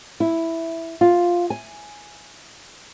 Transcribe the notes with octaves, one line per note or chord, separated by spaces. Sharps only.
E4
F4
G#5